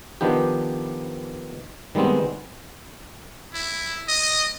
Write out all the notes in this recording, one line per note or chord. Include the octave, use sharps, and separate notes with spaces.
D#3 F3 B3 D4 G4
D#3 G3 G#3 B3 C4
E4
D#5